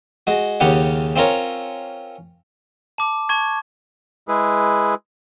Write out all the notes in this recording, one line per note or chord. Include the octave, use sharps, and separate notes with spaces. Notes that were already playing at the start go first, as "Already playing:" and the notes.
G#3 F#4
D#2 C#3 C#4 G4 F#5
C4 C#4 F4 A#4 C#5
A5 D6
A5 C#6 G#6
G#3 E4 G#4 B4